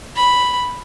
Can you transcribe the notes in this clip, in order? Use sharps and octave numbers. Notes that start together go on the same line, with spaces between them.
B5